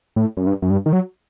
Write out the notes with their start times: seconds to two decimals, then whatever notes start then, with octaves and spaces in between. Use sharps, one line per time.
0.16 A2
0.37 F#2
0.47 G2
0.62 F#2
0.70 G2
0.86 D#3
0.93 F#3